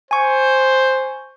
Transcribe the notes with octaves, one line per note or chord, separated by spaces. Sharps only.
C5 G#5 C#6